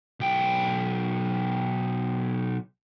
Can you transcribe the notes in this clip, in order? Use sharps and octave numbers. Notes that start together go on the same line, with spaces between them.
B1 G5